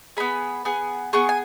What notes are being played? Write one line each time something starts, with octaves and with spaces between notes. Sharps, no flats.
B3 G#4 B5
B3 G#4
B3 G#4 C#6
G#5